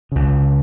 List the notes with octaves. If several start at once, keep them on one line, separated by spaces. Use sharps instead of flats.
C#2 C#3